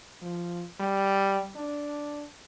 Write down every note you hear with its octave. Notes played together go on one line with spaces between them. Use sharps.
F3
G3
D4